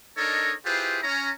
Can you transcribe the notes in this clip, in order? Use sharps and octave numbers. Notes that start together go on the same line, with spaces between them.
D4 D#4 A4 A#4 C#5 D#5
E4 F4 G4 G#4 B4 C5
C#4 A#5